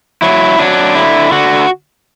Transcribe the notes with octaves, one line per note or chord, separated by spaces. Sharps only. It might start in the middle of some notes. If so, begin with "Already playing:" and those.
F#3 E4
F#3 D4
D3 E4
D3 F#4